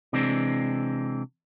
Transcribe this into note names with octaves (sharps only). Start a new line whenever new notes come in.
C3 E3 G#3 C4 D4